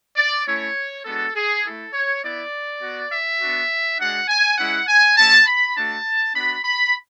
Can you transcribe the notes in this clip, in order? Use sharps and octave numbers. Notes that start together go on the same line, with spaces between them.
D5
A3 C#4 E4 C#5
G#3 B3 D4 F#4 A4
G#4
A3 E4 A4
C#5
B3 E4 D5
B3 F#4
E5
B3 D4 F#4
G#3 D4 F#4 F#5
G#5
G#3 C#4 E4 F#5
G#5
A3 C#4 E4 A5
B5
A3 D4 F#4 A5
B3 D4 F#4 B5
B5